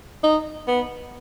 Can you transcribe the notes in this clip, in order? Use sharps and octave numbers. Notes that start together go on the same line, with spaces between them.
D#4
B3